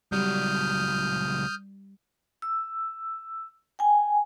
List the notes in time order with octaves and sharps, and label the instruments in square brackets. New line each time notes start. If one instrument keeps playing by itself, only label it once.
[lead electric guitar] C#2 F#3 [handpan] G3 [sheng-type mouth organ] D#6 F6 G6
[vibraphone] E6
G5 G#5